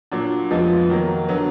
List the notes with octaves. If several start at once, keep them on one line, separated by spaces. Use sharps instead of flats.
A#2 F#3 D4
F2 F3 G#3 B3
D#3 F#3 A#3
D3 F#3 B3